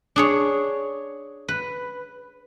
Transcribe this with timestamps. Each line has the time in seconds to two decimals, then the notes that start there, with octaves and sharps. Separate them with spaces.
0.16 D4 G#4 C#5
1.48 B4